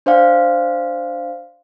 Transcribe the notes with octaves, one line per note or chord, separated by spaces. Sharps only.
D4 C5 D5 F5